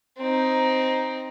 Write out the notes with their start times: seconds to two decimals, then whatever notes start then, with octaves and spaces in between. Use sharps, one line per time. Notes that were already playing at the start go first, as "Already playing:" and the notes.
0.18 C4 D#4